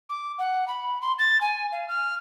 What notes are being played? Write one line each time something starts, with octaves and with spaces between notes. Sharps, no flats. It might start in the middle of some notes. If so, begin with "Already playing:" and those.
D6
F#5
B5
C6
A6
G#5
F5
F6